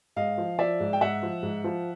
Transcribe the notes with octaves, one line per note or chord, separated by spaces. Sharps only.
G#2 D#5 F5
F3
F3 D5 E5
G#2
G5
G#2 E5 F#5
F3
G#2
F3